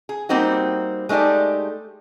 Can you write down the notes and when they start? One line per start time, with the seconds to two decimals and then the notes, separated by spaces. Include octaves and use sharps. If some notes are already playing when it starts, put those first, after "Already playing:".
0.09 G#4
0.29 G3 A#3 C4 D#4 F#4
1.09 G#3 A3 D#4 G4 D5